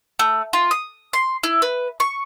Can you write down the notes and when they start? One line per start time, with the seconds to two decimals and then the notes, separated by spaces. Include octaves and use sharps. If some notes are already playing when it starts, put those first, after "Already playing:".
0.19 A3
0.53 F4
0.71 D#6
1.13 C6
1.43 E4
1.62 B4
2.00 C#6